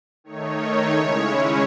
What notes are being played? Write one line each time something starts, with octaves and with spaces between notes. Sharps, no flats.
D#3 A3 D#4 C#5
C#3 G#3 C#4 E4